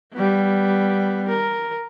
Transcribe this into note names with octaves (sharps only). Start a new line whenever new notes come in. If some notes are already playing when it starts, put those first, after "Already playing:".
G3 B3
A#4